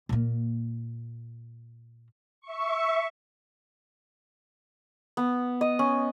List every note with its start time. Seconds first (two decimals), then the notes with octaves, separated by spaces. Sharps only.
0.09 A#2 A#3
2.41 E5 C#6
5.17 B3
5.61 D#5
5.79 C#4